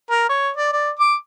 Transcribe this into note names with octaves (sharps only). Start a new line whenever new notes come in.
A#4
C#5
D5
D5
D6